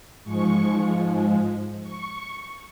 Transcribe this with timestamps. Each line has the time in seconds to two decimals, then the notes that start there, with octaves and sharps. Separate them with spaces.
0.24 G#2 F3 G#3 C#6
1.82 C#6